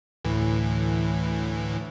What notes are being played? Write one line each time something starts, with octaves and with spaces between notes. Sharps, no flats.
D2 A2 E3